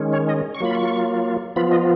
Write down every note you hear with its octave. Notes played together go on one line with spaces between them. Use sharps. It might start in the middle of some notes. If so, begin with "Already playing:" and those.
Already playing: D#3 G#3 C#4
C#5
D#5
C#6
F#3 A#3 F4 B5
C#6
F3 B3 F4 B5
D#5